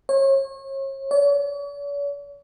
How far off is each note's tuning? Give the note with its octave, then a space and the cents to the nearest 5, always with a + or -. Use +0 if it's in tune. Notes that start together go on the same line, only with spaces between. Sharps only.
C#5 -35
C#5 +45